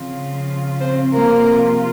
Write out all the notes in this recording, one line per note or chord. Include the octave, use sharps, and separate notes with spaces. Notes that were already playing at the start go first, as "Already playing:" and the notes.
Already playing: C#3 F3 C4 F4
C4 C5
C3 F3 A#3 C4 F4 A#4